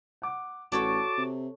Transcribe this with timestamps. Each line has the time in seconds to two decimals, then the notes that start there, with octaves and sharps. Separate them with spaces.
0.22 F#5 D6
0.72 A1 F#4 A4 C#5 D5 A5 D6
1.17 C3